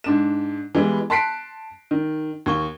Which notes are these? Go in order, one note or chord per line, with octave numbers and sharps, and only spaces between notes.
G#2 D4 E7
E3 G3 G#3 B3
A5 C6 F#6 B6 C7 D7
D#3
D#2 C#6 G7